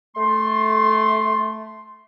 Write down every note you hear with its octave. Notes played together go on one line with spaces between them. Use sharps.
A3 C6